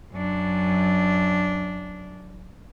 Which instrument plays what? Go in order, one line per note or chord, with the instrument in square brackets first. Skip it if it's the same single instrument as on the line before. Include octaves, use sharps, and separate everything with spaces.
[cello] F#2 D4